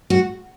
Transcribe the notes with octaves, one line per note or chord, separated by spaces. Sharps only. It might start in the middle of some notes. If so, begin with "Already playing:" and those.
F#4